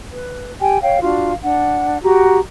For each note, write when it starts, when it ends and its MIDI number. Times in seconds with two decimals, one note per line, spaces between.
0.11 0.53 71
0.60 0.78 67
0.60 0.78 79
0.60 0.78 80
0.81 1.02 73
0.81 1.02 77
0.81 1.02 79
1.02 1.31 62
1.02 1.31 65
1.02 1.31 66
1.02 1.31 77
1.43 1.98 62
1.43 1.98 78
2.02 2.38 66
2.02 2.38 67
2.02 2.38 82